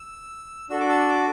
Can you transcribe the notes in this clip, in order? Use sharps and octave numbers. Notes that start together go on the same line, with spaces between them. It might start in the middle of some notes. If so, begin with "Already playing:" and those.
Already playing: E6
D4 F#4 A4 E6
D6
E6
D6